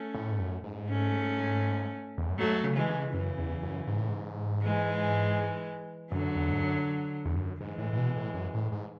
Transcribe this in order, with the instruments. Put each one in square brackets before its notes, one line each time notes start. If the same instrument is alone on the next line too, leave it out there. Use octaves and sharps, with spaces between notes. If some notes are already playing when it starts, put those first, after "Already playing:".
Already playing: [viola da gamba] A3 C#4
[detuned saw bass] A2
G#2
F#2
G#2
[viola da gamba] A3 C#4
[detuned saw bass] E2
F#2
[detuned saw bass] G#2 [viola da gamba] F#3 A3
[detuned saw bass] C#3
[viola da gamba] E3 G#3
[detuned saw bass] C#3
[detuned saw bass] F#2 [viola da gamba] C#3 E3
[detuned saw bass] E2
F#2
G#2
A2
G#2
[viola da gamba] E3 G#3
[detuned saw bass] F#2 [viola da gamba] D3 F#3
[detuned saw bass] E2
G#2
F#2
E2
F#2
[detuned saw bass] G#2 [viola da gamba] E3 G#3
[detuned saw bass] A2
A2
B2
A2
F#2
A2
G#2